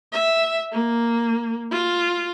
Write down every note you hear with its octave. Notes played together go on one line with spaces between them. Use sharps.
E5
A#3
F4